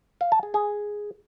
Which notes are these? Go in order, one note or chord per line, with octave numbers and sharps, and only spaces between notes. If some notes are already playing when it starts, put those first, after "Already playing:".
F5
A5
G#4
G#4